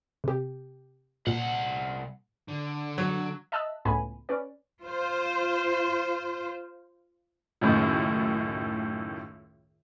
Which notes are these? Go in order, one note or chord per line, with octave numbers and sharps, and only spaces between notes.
C3 G4
C2 A#2 F#5
D3
F#3
D#5 E5 A5 E6 F#6
C#2 A2 B3 G#5 B5
C#4 B4 D5
F4 C5
C#2 F#2 A2 D#3